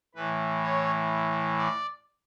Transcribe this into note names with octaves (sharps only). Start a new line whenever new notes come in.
A2 E3 B4
C#5
D5